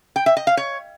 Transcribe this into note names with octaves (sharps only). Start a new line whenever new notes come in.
G5
E5
D#5
F5
C#5